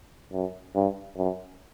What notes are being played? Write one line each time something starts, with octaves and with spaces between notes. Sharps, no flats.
F#2
G2
F#2